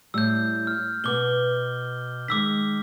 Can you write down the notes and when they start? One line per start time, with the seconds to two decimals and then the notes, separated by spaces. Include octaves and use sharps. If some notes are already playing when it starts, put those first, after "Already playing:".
0.14 A2 G3 E6 G6
0.67 F6
1.04 B2 B3 D6 G7
2.28 D#3 G#3 D6 E6 B6